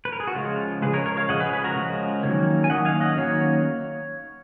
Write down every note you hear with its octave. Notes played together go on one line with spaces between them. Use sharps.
B4
A#4
G#4
F#4
C#3 F3 G#3 F4
C#3 F3 G#3 G#4 B4
A#4 C#5
A#4 C#5
C#5 F5
C#3 F3 G#3 D#5 F#5
G#4 B4
G#4 B4
F#4 A#4
C#3 F3 G#3
D#3 F#3 A#3 C#4
G#5
D#3 F#3 A#3 C#4 D#5 F#5
F5 G#5
D#5 F#5
D#3 F#3 A#3 C#4 C#5 F5